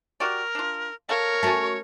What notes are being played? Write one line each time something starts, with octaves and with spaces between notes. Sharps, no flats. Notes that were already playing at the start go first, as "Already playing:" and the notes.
F#4 G4 A#4 D5
D4 F4
A4 A#4 C#5 F5
A3 C#4 F#4 A5